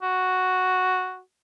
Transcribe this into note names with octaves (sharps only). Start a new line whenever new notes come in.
F#4